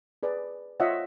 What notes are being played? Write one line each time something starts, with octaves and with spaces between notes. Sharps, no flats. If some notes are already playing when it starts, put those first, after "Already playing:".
G#4 B4 D5
F4 C5 C#5 D#5 E5 F#5